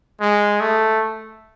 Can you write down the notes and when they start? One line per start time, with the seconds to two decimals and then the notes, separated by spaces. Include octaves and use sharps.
0.20 G#3
0.61 A3